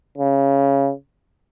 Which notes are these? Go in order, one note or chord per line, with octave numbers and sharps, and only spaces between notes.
C#3